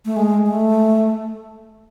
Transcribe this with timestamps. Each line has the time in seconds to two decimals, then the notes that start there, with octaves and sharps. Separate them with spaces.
0.05 A3
0.17 G#3
0.46 A3